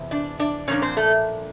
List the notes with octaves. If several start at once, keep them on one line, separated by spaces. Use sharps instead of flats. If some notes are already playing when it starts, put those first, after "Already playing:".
Already playing: E2 C3
D4 D5
D4 D5
A#2 F3 A#3 C#4 D4 C#5
C4 C5
A3 A4